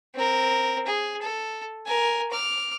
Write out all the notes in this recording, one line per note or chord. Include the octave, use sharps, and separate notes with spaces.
C4 A#4
G#4
A4
A#4 G#5
D6 F6